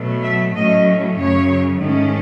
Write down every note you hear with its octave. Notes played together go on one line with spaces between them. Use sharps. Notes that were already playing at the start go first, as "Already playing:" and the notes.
Already playing: B2 F#3 A3
E5
A2 F#3 A3 C#4 D#5
F#2 C#3 F#3 C#5
G#2 D#3 A3 C#4